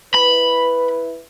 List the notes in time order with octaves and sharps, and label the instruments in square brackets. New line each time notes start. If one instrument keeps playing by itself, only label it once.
[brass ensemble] E4 B4 [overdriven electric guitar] B5